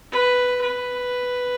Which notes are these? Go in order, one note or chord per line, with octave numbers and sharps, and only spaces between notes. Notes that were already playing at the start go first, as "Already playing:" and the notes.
B4
B4